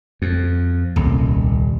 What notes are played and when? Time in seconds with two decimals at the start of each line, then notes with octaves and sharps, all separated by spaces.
0.22 F2
0.96 D#1 C2